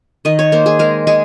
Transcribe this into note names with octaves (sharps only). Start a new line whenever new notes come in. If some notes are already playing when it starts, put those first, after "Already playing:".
D#3 D#5
C#5
A#3 C5
G#4
G#3 A#4
G#3 G#4